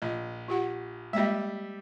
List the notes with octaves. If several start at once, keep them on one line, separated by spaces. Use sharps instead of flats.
A#1 D#5
F4 G4 F#5
G3 G#3 A#3 D#5 E5